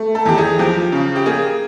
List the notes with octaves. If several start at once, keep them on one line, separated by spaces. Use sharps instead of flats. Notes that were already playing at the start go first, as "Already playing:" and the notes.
Already playing: A3
A4
E2 G4
G#4
F3 G4
C#3
G4
A#3 G#4